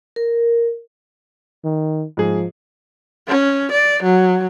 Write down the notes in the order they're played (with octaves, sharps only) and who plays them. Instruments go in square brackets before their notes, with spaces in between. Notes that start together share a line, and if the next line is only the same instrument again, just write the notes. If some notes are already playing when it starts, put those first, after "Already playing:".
[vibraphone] A#4
[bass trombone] D#3
[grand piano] G#2 G#4 [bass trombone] F3
[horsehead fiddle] C#4
D5
F#3